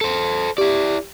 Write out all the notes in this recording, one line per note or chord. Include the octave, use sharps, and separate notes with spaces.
A4 C5
E4 G4 D5